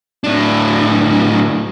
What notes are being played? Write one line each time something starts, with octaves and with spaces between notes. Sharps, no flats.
A2 D4